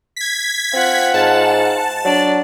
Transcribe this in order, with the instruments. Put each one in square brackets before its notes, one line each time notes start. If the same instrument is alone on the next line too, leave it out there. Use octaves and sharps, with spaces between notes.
[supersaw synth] G#6 B6
[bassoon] C4 [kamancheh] F4 F#5
[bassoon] G#2 [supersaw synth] A5
[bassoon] F#3 [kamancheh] D4 D5